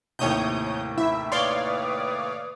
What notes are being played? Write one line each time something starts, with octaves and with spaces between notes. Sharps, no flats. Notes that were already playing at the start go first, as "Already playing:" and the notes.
D#2 A2 C3 C#5 D#6 G6
E4 E5
B4 C#5 D5 F5 C6 D6 D#6